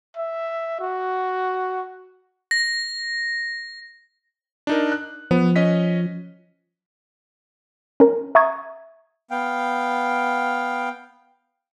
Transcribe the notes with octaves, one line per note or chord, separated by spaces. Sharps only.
E5
F#4
A#6
D4 D#4 A#4
F#6
F3 B3
C#4 D#5 B6
C#4 A#4
E5 A#5 C#6 D#6 G#6
B3 F5 G5